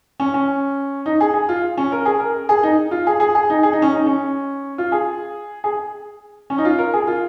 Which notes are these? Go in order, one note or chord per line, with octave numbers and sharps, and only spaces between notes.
C#4
C#4
D#4
G#4
G#4
F4
C#4
A#4
G#4
A#4
G#4
D#4
F4
G#4
G#4
G#4
D#4
G#4
D#4
C#4
D#4
C#4
F4
G#4
G#4
C#4
D#4
F4
A#4
G#4
F4